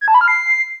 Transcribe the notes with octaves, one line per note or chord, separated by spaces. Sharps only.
G#6
A5
B5
F6
C7